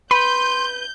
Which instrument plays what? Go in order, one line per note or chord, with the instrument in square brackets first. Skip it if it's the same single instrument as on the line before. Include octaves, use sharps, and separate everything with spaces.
[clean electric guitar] B4 [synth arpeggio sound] B5 [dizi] C6 [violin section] G6